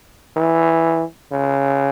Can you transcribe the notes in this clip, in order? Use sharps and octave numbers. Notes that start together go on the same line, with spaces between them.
E3
C#3